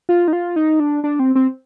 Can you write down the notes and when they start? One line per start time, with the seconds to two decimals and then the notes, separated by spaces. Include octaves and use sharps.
0.09 F4
0.28 D#4
0.33 F4
0.56 D#4
0.80 D4
1.04 D4
1.19 C4
1.35 C4